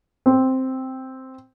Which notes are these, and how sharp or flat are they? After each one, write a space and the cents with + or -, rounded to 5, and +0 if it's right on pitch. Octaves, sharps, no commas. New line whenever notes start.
C4 +0